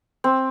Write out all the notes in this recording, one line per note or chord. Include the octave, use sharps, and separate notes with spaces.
C4